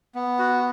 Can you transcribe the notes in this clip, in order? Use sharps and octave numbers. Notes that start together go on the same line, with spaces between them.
B3
F#4